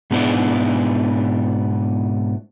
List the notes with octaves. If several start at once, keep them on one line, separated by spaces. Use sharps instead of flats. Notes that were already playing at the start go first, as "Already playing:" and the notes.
G#2 B2 B3 D4 E4